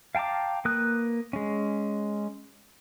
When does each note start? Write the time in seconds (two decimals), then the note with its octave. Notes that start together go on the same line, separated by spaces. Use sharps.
0.15 F5 G5 A5 A#5 D6
0.65 A#3 B4 D#6 F#6
1.33 G#3 C#4